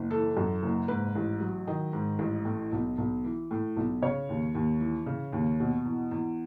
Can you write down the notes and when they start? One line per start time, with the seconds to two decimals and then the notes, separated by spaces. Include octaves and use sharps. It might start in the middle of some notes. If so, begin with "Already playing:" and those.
Already playing: F#1
0.10 E3 A4
0.37 F#2
0.63 F#1
0.88 G#2 B4
1.15 A1
1.40 F#3
1.67 D#3 D#5
1.93 G#2
2.19 A1
2.45 A2
2.72 B1
2.98 B1
3.24 E3
3.51 A2
3.76 B1
4.02 C#3 C#5
4.29 D#2
4.55 D#2
4.80 E3
5.06 C#3
5.33 D#2
5.60 B2
5.85 E2
6.11 E2